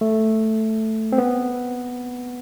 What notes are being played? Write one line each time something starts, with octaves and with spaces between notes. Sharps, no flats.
A3
C4
B3